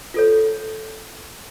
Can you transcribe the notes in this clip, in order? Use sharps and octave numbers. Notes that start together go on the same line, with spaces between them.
F4 A4 C#5